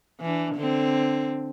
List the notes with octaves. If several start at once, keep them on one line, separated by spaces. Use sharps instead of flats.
E3 D4
D3 C4